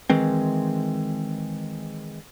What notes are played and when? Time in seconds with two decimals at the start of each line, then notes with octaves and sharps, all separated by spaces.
0.10 D#3 E3 G#3 C4